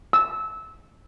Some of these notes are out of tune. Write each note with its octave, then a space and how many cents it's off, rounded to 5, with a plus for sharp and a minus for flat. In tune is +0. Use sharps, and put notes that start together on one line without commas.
E6 -20